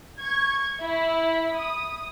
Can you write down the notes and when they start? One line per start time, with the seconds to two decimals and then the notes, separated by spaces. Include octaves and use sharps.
0.19 C#6 G#6
0.83 E4
1.55 D#6